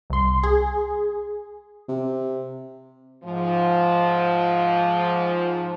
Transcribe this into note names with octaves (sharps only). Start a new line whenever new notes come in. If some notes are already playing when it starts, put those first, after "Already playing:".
C2 C6
G#4
C3
G#2 F3